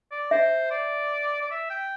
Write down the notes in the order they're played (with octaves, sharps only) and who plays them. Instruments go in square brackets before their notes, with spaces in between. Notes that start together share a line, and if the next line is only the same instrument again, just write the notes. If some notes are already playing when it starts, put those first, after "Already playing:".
[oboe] D5
[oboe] C5 [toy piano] E5
[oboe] D5
D5
E5
G5